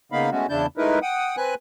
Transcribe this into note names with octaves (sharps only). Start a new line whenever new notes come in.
C#3 A#3 B3 D#4 F5 B5
G#3 A3 B3 C#4 F#4
E2 C#3 D4 E4 A5 G6
G#3 A3 D#4 E4 A#4 B4
F#5 G5 D#6
C4 B4 G#5 F#6